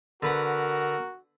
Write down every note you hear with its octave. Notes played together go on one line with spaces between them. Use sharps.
D3 F#4 A#4 B4 F#5